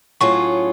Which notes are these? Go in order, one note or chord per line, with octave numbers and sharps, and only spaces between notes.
A2 F#3 C#4 F4 G#4 C#6